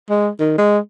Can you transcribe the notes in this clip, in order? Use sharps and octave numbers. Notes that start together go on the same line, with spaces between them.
G#3
D#3
G#3